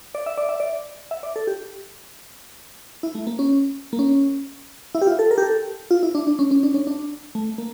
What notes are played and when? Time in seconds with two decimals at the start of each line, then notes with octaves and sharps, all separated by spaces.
0.15 D5
0.26 E5
0.37 D5
0.49 E5
0.60 D5
1.11 E5
1.23 D5
1.36 A4
1.47 G4
3.03 E4
3.15 A3
3.27 A#3
3.39 C#4
3.93 A#3
3.99 C#4
4.95 E4
5.02 G4
5.07 F4
5.19 A4
5.31 A#4
5.38 G4
5.43 A4
5.91 F4
6.03 E4
6.15 D4
6.27 D4
6.39 C#4
6.51 C#4
6.63 D4
6.74 C#4
6.87 D4
7.35 A3
7.58 A#3